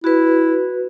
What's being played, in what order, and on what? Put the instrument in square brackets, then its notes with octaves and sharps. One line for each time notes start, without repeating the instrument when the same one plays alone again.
[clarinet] E4 [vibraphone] F#4 B4